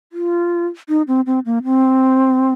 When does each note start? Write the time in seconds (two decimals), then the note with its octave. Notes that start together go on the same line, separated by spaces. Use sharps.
0.13 F4
0.89 D#4
1.08 C4
1.26 C4
1.46 A#3
1.64 C4